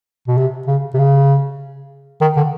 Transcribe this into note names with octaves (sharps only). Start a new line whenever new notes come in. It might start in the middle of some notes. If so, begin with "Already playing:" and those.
B2
C3
C#3
C3
C#3
D#3
D3